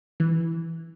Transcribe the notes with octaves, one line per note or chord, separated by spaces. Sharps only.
E3